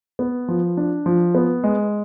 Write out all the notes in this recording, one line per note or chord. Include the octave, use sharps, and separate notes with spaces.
B3
F3
D4
F3
B3
G#3